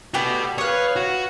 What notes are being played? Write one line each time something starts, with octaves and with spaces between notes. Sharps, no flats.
A3 F#4 G4 B4 D5
B4 C#5 F5 D#6 F#6
F#4